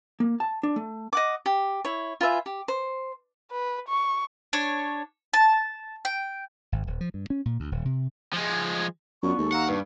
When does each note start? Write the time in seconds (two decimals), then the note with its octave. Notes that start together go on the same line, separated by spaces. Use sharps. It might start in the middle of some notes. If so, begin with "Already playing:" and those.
0.20 A#3
0.40 A5
0.63 D4
0.76 A3
1.13 D#5 F#5 D6
1.46 G4
1.85 E4 C#5
2.21 F4 B4 E5 G#5
2.46 G4
2.68 C5
3.51 B4
3.88 C#6
4.53 D4 C#5
5.34 A5
6.05 G5
6.72 G#1
6.87 D#1
7.01 F3
7.14 G2
7.30 C#4
7.45 A#2
7.60 D2
7.72 D#1
7.85 C3
8.33 F3 G#3
9.23 F#2 B3 D4 F4 C#6
9.38 D#2 G#3 A4
9.52 F5 F#5 A#5 E6
9.68 G2 D4 B4